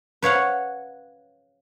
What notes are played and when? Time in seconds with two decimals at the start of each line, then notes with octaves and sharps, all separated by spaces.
0.22 B4 C#5 F5 F#5